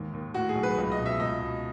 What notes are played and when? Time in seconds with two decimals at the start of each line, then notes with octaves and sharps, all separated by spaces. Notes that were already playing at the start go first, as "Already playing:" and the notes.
Already playing: D#2 G#2 D#3
0.13 D#2
0.34 A2 F#4
0.49 G#4
0.55 B1
0.63 B4
0.78 C#2
0.92 D#5
0.99 B2
1.06 E5
1.20 C#2 D#5
1.41 B2